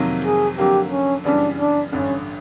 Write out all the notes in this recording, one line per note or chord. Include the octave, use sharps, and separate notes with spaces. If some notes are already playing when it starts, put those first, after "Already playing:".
Already playing: F2 C3 D#3 F#3 A#3
G#4
F2 D3 F#3 A#3 G4
C#4
F#2 C#3 E3 G3 B3 D4
D4
A1 G2 D3 C#4